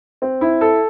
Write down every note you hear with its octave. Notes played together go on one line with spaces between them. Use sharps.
C4
E4
A4